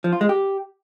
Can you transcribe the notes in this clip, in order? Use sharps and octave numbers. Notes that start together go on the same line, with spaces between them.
F3
F4
G#3
G4